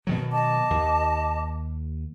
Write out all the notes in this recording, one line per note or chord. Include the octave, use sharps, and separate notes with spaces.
B2 D#3 F#3
D#5 A5 D6
D#2